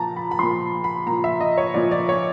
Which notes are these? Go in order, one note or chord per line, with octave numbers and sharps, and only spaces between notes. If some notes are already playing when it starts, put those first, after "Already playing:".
Already playing: A#2 F3 A5 A#5
B5
B5
A#2 F3 C6
B5
A#2 F3 A#5
E5
D#5
C#5
A#2 F3 D5
D5
C#5